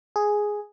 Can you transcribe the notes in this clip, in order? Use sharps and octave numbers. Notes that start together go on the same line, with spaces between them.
G#4